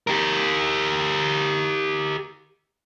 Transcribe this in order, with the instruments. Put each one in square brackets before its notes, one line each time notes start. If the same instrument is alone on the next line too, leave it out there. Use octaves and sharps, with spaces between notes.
[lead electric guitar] G4 A#4